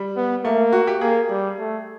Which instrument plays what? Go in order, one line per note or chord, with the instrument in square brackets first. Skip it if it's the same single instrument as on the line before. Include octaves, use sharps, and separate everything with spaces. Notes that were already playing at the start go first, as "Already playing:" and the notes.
Already playing: [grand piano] G3
[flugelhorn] B3
[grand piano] A3 [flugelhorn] A#3
[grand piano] F#4
G4
[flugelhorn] A#3 [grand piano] G#4
[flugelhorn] G3
A3